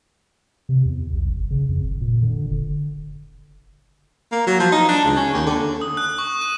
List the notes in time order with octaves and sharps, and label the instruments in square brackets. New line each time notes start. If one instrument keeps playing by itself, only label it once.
[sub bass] C3
E2
B1
G1
C#3
F2
F#1
A#2
D3
F#1
[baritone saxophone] A#3
F#3
F3
D#4
D4
C#2
C#4
D#2
D3
[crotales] D#6
F#6
C#6
D#7